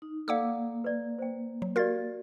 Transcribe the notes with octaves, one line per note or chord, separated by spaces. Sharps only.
D#4
A#3 A4 D5 F5 F#5 D6 E6
B4 D5
C5 G5
F#3
F#4 G4 A#4 D5 F5 A6